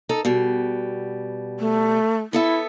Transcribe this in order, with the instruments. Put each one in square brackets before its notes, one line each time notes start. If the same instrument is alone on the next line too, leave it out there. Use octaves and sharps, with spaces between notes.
[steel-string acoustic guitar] D#4 A4
B2 G3
[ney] A3
[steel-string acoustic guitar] B3 A4 E5 [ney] E4